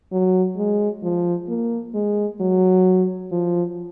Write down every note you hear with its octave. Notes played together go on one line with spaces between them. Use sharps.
F#3
G#3
F3
A#3
G#3
F#3
F3